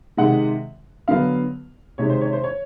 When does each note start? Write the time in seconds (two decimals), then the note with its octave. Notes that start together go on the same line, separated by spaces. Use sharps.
0.17 C3 D#3 G#3 F#5
1.08 D3 F#3 B3 F5
1.98 C3 D#3 G#3 C#5
2.09 C5
2.21 C#5
2.33 C5
2.44 C#5